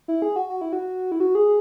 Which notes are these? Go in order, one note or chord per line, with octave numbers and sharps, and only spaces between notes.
E4
G#4
F#4
F#4
E4
F#4
E4
F#4
G#4